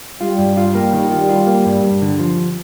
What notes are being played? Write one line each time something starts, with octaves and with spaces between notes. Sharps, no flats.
G3 F4
G2
F4
A#3
D#3
F4
F4
A#3
G2
G2
D3
F3